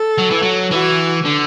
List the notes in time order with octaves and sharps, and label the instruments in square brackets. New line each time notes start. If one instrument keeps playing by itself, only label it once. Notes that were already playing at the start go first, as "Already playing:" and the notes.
Already playing: [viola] A4
[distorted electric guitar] F#3
E3
F#3
[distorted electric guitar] E3 [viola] F#4
[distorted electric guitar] D3